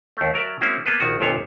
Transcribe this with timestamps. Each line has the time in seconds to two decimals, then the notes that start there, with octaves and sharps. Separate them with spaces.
0.17 D#2 A3
0.34 F#3 A#4 D5 E5
0.61 G#3 A#3 C4 C#4 E4 F#4
0.86 A#3 B3 A4 B4
1.00 A#1 D#3 F#4
1.20 G1 F2 A#2 B3 C5 C#5